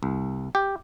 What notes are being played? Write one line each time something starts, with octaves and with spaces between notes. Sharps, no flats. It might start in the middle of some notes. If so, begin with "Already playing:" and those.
C2
G4